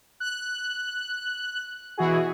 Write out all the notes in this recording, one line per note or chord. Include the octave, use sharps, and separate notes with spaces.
F#6
B2 E3 E4 F#4 G#4